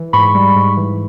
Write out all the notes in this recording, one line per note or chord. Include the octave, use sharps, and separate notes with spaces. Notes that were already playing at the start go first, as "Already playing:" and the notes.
Already playing: E3
G#2 B5 C#6
G3
G#2
E3